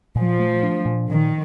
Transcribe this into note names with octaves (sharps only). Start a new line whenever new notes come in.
A#2 F3
A3
D4
A#2
A#2 D#3